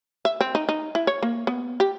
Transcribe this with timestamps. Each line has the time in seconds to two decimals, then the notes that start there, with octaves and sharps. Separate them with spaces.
0.25 E5
0.41 C4
0.55 D#4
0.69 D#4
0.95 E4
1.07 C#5
1.23 A#3
1.47 B3
1.80 G4